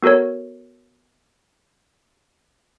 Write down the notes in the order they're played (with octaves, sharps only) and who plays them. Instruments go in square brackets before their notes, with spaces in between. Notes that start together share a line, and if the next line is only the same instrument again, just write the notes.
[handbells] B3 F#4 A4 A#4 C#5